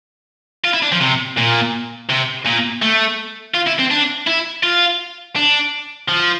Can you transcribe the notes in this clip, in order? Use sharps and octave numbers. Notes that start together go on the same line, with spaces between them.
F4
E4
D4
F3
C3
A#2
C3
A#2
A3
F4
E4
C4
D4
E4
F4
D4
F3